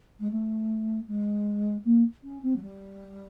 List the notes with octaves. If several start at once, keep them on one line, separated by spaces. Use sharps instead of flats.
G#3
A3
G#3
A#3
C#4
C4
F#3
G3